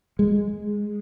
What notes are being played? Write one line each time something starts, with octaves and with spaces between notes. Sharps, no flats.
G#3